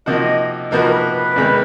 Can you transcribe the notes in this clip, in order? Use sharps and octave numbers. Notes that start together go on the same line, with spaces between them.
C3 F3 A#3 D#4 F#4 D#5
C3 F3 A#3 D#4 F#4 B4
A#4
B4
E2 C3 D#3 G#3